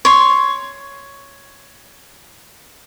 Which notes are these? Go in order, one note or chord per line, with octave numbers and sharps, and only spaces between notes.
C#5 C6